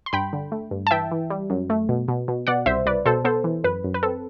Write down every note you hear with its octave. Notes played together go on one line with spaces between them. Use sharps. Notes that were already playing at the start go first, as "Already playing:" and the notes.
C6
G2 G5 B5
D3
A3
G2
A5
E3 E5 G5
E3
G3
F#2
A3
B2
B2
B2
B2 D5 F#5
C2 C5 E5
C2 B4 D5
B2 A4 C5
B3 A4 C5
E3
F#2 B4
F#2
B4
C4 A4